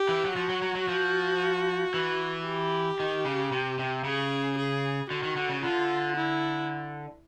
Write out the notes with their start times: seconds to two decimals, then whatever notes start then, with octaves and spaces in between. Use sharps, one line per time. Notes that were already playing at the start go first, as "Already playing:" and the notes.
Already playing: G4
0.09 E3
0.25 F#3
0.36 F3 F#4
0.49 F#3
0.62 F#3
0.75 F#3
0.88 F3
1.94 E3
2.47 G4
3.00 D#3
3.25 C#3
3.52 C3
3.79 C3
4.04 C#3 G#4
4.57 G#4
5.10 D3 F#4
5.23 D#3
5.36 D3
5.50 C#3
5.63 D3 F4
6.16 E4